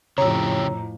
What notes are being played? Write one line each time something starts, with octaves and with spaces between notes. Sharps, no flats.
F2 A2 C#3 G4 C#5 A#5 E6